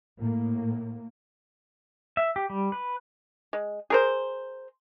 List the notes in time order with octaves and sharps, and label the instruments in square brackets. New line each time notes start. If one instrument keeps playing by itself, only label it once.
[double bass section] A2 A#3
[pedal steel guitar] E5
G4
G3
B4
[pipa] G#3
G#4 A#4 C5